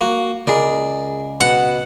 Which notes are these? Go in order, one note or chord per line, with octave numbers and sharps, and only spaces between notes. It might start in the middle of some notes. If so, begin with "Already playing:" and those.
A#3 F#4
C#2 G#4 A#4 D5
B2 F#5